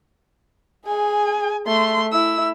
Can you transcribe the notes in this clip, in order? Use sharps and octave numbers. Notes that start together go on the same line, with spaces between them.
G#4 G#5
A3 C6
E4 E6